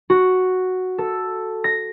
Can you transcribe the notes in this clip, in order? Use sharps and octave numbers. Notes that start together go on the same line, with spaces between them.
F#4
A4
A#6